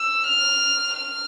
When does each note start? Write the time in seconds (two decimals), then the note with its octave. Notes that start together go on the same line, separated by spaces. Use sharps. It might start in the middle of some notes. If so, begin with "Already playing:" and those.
Already playing: E6
0.27 F6
0.95 F6